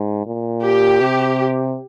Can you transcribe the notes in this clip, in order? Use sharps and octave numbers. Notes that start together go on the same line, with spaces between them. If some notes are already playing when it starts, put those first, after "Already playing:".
Already playing: G#2
A#2
G4
C3